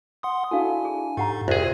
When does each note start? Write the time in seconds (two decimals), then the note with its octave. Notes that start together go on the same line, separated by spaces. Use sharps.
0.23 F#5 C6 D#6
0.51 D4 E4 F#4 A4 F5 G#5
0.85 G#4
1.17 G#2 G4 A4 F#5 A#5
1.48 C2 F2 F4 G#4 C5